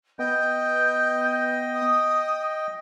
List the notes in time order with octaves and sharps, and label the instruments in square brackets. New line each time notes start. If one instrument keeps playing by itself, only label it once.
[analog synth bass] B3 [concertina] D#5 G5 [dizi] G6
[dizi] D#6